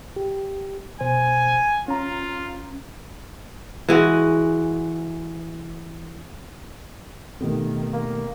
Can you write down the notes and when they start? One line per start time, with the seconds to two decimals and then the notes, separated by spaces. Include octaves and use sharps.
0.16 G4
1.01 B2 C5 G#5
1.88 C#4 F4 A#5
3.89 E3 G#3 F#4
7.41 B2 D#3 A3 B3 C4 G4 A4
7.93 A#3